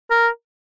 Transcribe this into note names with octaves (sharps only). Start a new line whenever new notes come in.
A#4